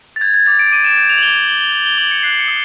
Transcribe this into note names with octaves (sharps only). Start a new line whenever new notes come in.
A6
G6 G#6
G#6
D6 A6
D7
D6 D#7
E7
G6 D7
F7
F#7
D6 G7
F#7
D6 G7
G7
G6 F#7
G7
D6 F#7
C#7
F#6 C7
C#7
D#6